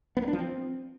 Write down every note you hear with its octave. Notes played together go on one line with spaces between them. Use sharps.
B3
A#3
D4
F3
C4